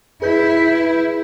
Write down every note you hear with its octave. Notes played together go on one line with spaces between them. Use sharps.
E4 G#4 B4 G6